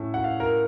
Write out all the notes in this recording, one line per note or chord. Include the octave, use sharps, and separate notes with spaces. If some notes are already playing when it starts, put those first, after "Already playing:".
Already playing: A2 A3 C#4
F#5
F5
A#4